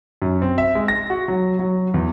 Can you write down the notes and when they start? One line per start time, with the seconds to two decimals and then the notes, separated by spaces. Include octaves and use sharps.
0.22 F#2
0.42 C4
0.58 E5
0.75 G#3
0.88 A#6
1.10 F#4
1.28 F#3
1.59 F#3
1.94 E2